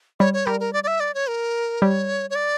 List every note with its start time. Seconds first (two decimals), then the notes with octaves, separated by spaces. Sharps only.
0.20 G3 C#5
0.34 C#5
0.46 G3 A#4
0.60 A#4
0.73 D5
0.84 D5
0.87 E5
1.00 D5
1.14 C#5
1.27 A#4
1.82 G3 C#5
2.30 C#5
2.35 D5